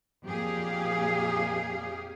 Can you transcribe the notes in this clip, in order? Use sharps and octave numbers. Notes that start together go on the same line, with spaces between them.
F2 A#2 G4 G#4 F5